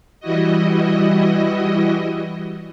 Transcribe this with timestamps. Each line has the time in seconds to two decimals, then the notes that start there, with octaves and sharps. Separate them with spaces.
0.20 E3 G3 E4 F#4 D#5